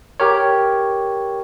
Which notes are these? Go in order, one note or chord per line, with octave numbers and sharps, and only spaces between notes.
G4 A#4 C#5